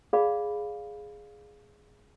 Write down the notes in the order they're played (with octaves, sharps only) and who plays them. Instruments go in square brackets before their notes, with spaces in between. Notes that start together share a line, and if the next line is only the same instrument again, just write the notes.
[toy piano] G#4 D5 F5 B5